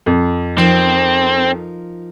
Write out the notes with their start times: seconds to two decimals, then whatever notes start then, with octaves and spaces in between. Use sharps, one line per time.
0.06 F2
0.58 F3 C4 D#4 A#4